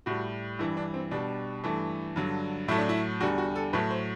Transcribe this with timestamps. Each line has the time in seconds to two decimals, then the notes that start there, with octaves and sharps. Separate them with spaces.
0.06 A2 G3 F#4
0.59 G2 E3 G3 E4
0.77 D4
0.94 C4
1.11 B2 G3 D4
1.64 G2 E3 A3
2.16 G2 D3 F#3
2.68 A2 F#3 A3 E4
2.78 D4
2.89 E4
3.20 E2 D3 G3 F#4
3.38 F#4
3.56 A4
3.73 A2 F#3 A3 B4
3.91 C5